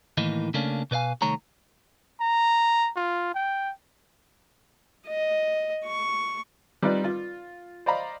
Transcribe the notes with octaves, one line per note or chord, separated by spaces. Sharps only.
A2 D#3 E3 A#3 D#4
C#3 A3 A#3 C#4 D4
B2 B4 C#5 F5 G#5
C2 D#3 A3 C#5 A#5
A#5
F4
G5
D#5
C#6
G3 C4 D#4 F4 B4 D5
F4
C5 D5 D#5 F5 A#5 B5